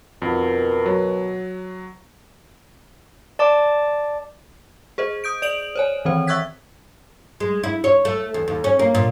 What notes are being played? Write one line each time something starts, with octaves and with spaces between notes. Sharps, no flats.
F2 B2 D#3
F#3
D5 A5 D6
G#4 C5 D#5
D#6 G6 D7
D5 D7 F7 F#7
C5 C#5 G#5
D#3 E3 C4 C5
E5 C#6 E6 F#6 G#6 B6
G#3
E4
C#5
A3
E2
D#2
C#4
A#3
A#2